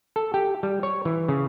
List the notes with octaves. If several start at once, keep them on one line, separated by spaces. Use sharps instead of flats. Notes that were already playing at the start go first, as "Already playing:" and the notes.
A4
G4
G3
C#5
E3
C#3